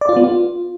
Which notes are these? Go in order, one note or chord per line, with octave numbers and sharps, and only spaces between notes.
D5
F4
B3
F4